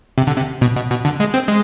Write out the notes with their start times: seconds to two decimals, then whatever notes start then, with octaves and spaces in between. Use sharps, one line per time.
0.18 C3
0.27 D3
0.37 C3
0.61 B2
0.76 B2
0.91 B2
1.05 D3
1.20 G#3
1.34 C4
1.48 G#3